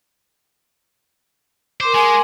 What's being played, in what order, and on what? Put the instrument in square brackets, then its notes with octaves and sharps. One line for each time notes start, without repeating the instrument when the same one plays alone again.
[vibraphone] A#4 C6 D6 [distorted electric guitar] C5
[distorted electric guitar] G#3 [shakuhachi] G#5